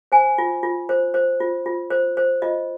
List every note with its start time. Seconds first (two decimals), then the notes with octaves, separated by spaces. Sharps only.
0.12 C5 G#5
0.38 F4
0.63 F4
0.89 C5
1.14 C5
1.40 F4
1.66 F4
1.90 C5
2.17 C5
2.42 F4 D#5